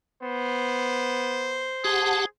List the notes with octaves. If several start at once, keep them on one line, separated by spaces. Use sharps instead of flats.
B3 C5
G4 G#4 F#5 A5